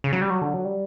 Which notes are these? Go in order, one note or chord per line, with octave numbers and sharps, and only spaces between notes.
C#3
F#3
G3
F#3
D3
F#3
G3